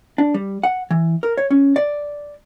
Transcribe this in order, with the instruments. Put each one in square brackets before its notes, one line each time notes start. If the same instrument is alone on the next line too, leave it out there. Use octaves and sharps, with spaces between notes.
[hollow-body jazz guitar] D4
G3
F#5
E3
A#4
C#5
C#4
D5